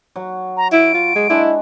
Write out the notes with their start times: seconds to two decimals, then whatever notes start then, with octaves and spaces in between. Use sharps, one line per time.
0.16 F#3
0.57 A#5
0.72 E4 D7
0.94 F4
1.16 G#3
1.30 G#3 D4 E4